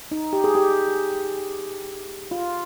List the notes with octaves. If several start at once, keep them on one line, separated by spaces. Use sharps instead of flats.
D#4
G4
G#4
G4
F4